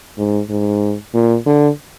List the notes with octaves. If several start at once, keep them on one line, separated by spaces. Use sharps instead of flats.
G#2
G#2
A#2
D3